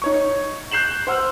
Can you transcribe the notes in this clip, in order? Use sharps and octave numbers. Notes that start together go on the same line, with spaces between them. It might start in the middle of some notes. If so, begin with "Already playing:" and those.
D#4 C#5 C#6
F#6 G6 C7 E7 F#7
C5 F#5 E6 F6